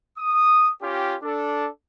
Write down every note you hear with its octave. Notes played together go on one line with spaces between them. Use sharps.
D#6
C#4 F4 G4
D4 A4